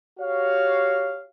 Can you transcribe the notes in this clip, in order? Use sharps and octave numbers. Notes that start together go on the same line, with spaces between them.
F#4 G4 C#5 F5